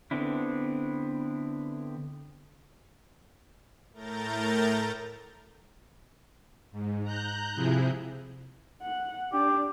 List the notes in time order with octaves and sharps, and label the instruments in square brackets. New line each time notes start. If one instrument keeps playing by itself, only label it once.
[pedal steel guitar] D3 B3 C4 D4 E4
[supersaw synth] A2 A3 A#4 A#5 G6 A6
[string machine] G#2
A#5 F#6 G6
C3 F3 E4 G#4
[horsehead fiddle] F#5
[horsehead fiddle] D4 [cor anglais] G4